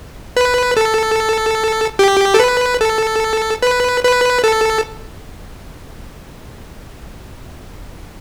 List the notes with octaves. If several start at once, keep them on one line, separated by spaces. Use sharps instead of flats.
B4
A4
G4
A4
B4
A4
B4
B4
A4